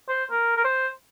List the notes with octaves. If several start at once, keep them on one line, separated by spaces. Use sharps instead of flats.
C5
A#4
A#4
C5